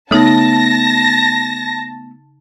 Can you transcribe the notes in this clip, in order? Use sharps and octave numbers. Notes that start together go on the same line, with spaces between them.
C#3 A3 B3 D#4 A5 A#6